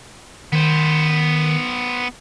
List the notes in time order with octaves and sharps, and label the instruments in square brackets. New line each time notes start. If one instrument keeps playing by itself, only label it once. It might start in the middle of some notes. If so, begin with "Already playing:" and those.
[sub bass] D#3 [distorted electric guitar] B3 C5